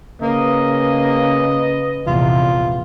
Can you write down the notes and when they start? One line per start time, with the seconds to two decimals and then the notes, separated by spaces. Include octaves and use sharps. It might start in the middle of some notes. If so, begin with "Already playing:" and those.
0.22 C#3 A#3 B4 D#5
2.07 A#1 E2 C3 F4